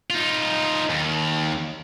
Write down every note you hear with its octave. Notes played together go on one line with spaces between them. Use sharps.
D#4 F4
D#2